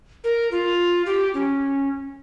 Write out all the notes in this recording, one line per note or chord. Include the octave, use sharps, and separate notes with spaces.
A#4
F4
G4
C#4